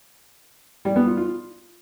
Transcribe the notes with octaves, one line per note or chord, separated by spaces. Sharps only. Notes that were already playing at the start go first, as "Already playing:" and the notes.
G3
B3
F4
F4